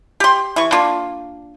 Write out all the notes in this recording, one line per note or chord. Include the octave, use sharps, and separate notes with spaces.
G4 C6
E3 C#6
A#3 D4 F4